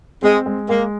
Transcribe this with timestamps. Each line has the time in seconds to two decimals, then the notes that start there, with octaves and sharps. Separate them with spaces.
0.23 G#3 C4
0.46 G#3
0.69 G#3 A#3